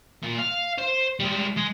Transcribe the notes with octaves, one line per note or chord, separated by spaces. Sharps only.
A#2
F5
C5
G3 G#3
G#3